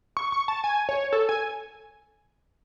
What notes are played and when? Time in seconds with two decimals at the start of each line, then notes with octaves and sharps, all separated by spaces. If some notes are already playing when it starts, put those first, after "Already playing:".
0.17 C#6
0.32 C#6
0.48 A5
0.64 G#5
0.89 C#5
1.12 A4
1.29 G#5